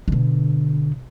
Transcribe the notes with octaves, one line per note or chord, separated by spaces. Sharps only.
B2 D3